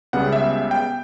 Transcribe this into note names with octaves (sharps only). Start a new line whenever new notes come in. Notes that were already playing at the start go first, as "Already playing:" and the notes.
C#2 C#3 G3 B3 F#5
E5
G5